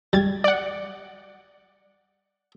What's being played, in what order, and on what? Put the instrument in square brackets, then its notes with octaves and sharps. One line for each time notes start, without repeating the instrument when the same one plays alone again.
[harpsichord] G3 [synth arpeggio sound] G#6 A6
[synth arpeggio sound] D5 F#5